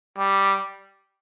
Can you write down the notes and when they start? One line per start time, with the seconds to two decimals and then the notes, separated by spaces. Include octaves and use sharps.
0.18 G3